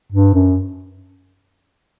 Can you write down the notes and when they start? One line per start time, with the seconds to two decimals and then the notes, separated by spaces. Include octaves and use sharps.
0.12 G2
0.34 F#2